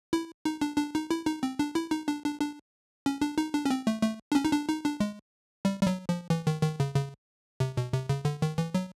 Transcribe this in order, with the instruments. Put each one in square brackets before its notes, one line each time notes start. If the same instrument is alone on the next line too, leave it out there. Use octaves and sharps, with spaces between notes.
[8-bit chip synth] E4
D#4
D4
D4
D#4
E4
D#4
C4
D4
E4
D#4
D4
D4
D4
C#4
D4
D#4
D4
C#4
C4
A3
A3
D4
C#4
D#4
D4
D#4
D4
G#3
G3
G3
F#3
F3
E3
D#3
D#3
C#3
C#3
C3
B2
C3
C#3
D3
D#3
E3
F#3